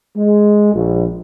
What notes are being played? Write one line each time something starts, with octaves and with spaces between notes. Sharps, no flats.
G#3
A#1